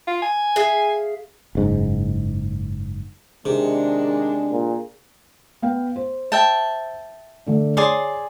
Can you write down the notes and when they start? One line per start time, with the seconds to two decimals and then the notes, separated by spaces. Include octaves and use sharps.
0.07 F4
0.22 G#5
0.56 G#4 E5 F5
1.55 F#1 G#2
3.45 C3 D#3 G#3 D4 G#4
4.51 A#2
5.62 B3 F5 G5
5.96 C5
6.32 E5 G5 A5
7.46 D3 A3 D4
7.77 G#4 C#5 D5 C6